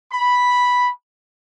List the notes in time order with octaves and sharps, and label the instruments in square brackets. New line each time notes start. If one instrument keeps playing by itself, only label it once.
[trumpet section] B5